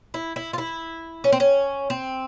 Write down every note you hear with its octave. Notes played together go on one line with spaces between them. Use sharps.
E4
E4
F4
E4
C#4
C4
C#4
C4